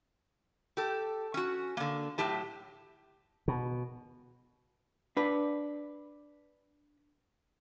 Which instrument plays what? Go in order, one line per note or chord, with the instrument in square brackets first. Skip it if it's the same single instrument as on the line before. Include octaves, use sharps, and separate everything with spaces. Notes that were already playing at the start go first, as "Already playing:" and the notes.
[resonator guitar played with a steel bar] G4 A4
C#4 F#4
D3 A#3
A2 F#3 G4 A5
[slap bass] B2
[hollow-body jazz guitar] D4 B4